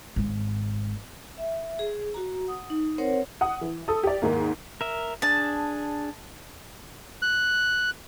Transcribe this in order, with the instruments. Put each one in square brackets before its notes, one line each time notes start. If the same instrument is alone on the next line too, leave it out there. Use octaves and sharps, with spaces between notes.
[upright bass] G#1 G#2
[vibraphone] E5
G#4
F#4 A#5
F#5 D#6
D#4
C4 A#4 C5 C#5 F#5
[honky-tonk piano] F#5 D#6
E3
A4 D#6
G4 D5
D#2 G#2 A#3
[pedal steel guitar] A#4 E5
[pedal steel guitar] D4 G#4 [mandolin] A5
[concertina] F#6